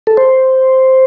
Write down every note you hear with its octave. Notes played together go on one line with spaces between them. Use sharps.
A4
C5